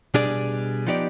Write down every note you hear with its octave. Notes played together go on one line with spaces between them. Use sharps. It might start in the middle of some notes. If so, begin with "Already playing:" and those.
B2 G3 D4 G#4 D5
F3 B3 D#4 G4 D5